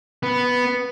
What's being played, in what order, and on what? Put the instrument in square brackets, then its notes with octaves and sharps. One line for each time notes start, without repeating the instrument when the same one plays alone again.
[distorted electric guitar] B3